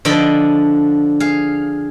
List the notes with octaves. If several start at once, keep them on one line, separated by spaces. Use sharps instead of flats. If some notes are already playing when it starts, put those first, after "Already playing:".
D3 F3 D4 D5 D#5 B5
G#4 F5